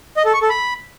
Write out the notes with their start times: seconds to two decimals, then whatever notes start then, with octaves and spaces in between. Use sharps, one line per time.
0.17 D#5
0.25 A4
0.33 C#6
0.42 A4
0.50 B5